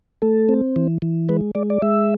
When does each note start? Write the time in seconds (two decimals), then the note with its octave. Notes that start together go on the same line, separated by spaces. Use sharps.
0.22 A3 A4
0.49 C4
0.76 E3
1.02 E3
1.29 G#3 B4
1.55 G#3 D5
1.70 D5
1.82 G#3 E5